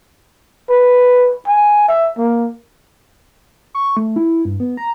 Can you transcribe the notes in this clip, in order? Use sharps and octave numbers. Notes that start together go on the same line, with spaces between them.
B4
G#5
E5
A#3
C#6
A3
E4
G2
B3
A#5